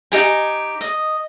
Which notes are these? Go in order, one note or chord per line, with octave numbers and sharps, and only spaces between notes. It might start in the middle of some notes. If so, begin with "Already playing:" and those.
D#4 G4 G#5
D#5